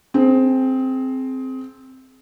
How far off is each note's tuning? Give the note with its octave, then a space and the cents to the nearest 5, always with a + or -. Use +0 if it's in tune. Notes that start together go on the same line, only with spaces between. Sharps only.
C4 +0 G#4 +25